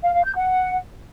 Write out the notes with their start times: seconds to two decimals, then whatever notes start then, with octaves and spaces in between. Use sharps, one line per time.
0.03 F5
0.14 F5
0.25 G6
0.35 F#5